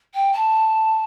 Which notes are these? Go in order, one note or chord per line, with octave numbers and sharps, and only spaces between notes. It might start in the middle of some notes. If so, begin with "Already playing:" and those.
G5
A5